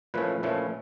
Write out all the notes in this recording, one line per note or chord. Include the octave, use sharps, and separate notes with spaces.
A#2 F3 A3 C#4 E4 B4
A#2 F3 A3 C#4 E4